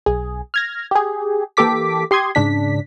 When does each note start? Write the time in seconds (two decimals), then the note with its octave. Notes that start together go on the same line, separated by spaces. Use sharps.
0.06 B1 G#4
0.54 F6 G#6 A#6
0.91 G4 G#4
1.57 E3 A#3 G4 A4 D6 B6
2.11 G4 C6 D#6 G#6
2.35 G#2 C#3 D4 B6